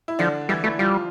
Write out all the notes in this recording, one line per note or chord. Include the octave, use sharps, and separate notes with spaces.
E4
D3 F3 D4
E3 G3 E4
E3 A3 E4
F3 G3 F4